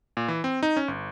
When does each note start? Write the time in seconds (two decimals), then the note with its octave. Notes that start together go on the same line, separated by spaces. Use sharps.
0.17 A#2
0.28 E3
0.44 C4
0.63 D#4
0.77 C#4
0.88 G1